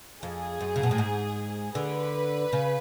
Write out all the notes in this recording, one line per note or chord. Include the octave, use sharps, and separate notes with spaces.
F2 G#4
F#2
C#3
B2
A2
G#2
D3 B4
C#3